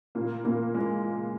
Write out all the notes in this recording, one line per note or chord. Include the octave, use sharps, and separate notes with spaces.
A#2 A#3
A#2 A#3
G#3